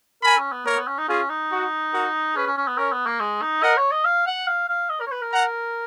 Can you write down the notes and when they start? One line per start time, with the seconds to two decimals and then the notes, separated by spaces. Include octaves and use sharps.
0.23 A#4 G#5 B5
0.38 C#4
0.52 B3
0.66 A#3 A#4 C#5
0.77 B3
0.87 C#4
0.98 D#4
1.08 C#4 F4 G#4
1.29 D#4
1.51 F#4
1.93 F#4 A#4
2.35 C#4 G#4 B4
2.46 C#4
2.57 C#4
2.67 B3
2.78 C#4 A#4 C#5
2.92 B3
3.06 A#3
3.20 G#3
3.42 D#4
3.62 A#4 D#5 F#5
3.77 C#5
3.91 D#5
4.05 F5
4.27 F#5
4.47 F5
4.69 F5
4.90 D#5
5.01 A#4
5.07 C#5
5.12 B4
5.22 A#4
5.32 F#5 A#5